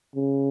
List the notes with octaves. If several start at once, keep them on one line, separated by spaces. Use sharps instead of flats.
C#3